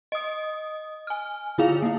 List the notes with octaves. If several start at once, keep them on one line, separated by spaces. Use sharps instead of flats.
D#5 D#6
G#5 F6
D3 E4 F4 G#4 F5 F7
A#3 E4